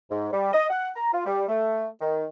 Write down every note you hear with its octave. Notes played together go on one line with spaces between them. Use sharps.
G#2
G3
D#5
F#5
A#5
F4
G3
A3
D#3